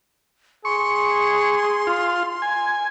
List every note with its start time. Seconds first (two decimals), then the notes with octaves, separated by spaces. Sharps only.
0.65 G#4 C6 C#6
1.87 F4
2.42 G#5